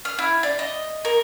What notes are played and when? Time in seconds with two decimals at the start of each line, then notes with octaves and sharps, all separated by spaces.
0.05 F6
0.19 E4
0.43 D5
0.59 D#5
1.05 A#4